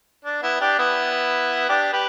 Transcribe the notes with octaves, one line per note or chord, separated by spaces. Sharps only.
D4
B3 E4
D4 G4
B3 E4
D4 G4
G4 B4